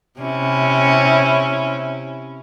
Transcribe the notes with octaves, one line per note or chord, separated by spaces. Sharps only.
C3 C#4 E4